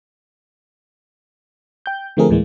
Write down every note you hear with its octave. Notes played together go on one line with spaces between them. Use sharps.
G5 G6
D3 F3 A3 C4 G#4 A#4
D2 A2 E3 G#3 A#3